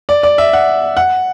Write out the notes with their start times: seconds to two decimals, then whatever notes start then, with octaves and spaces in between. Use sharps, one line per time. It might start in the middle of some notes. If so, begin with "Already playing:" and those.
0.09 D5
0.23 D5
0.38 E5
0.53 F#5
0.97 F#5